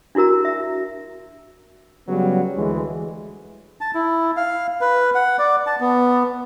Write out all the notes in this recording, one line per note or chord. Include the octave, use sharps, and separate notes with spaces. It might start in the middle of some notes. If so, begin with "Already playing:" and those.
D4 E4 F#4 A#4 A#5
E5
C#3 F#3 G3 B3
D2 E3 G#3
A5
E4
F5
B4
F#5
D5
A5
B3